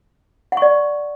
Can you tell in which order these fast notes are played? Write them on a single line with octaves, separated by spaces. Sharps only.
F#5 C#6 D5